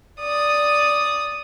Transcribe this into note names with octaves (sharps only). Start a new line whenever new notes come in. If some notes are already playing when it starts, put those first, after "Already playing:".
D5 D#6